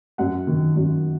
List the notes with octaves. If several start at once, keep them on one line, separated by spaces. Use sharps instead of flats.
F#2 F#5
D#3
F#2